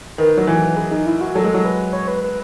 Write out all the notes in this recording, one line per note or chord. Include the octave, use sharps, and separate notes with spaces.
D#3 B4
F#3
E3
G#4
D#4
E4
F#4
F#3 A4
G#3
F#3
B4
C#5
B4
B4